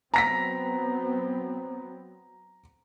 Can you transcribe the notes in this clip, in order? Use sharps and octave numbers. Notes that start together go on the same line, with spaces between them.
F#3 B3 C4 A#5 A#6 B6